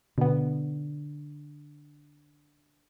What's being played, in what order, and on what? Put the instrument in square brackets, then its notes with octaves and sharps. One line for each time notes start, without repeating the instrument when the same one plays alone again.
[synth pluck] B2 B3 [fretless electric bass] D3